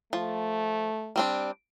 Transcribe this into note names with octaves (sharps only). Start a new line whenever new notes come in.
F3 A3
G3 C4 D4